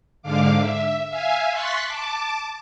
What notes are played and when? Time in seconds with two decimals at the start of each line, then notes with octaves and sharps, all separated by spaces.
0.22 G#2 D3 F5 D6
0.58 E5
1.08 E5 F5 G#5
1.52 C6 C#6 F#6 A6 B6
1.85 A5 D6